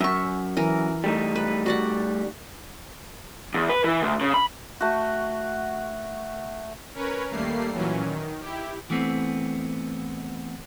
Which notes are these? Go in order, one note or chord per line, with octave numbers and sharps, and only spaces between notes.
F#2 E5 C#6
E3 A#4
G3 A3 D#4
B4
F#4 D5 F#5
E2
B4
E3
D2
C#3
B5
A3 F#4
C#4 A#4 B4 C#5
D#2 G3 A3 A#3 C7
A#2 E3 F#3 C#4
D#3
E4 G4
E3 A3 B3 C4